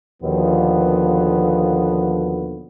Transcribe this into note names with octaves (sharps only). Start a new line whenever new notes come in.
D#2 B2 D3 F3 B3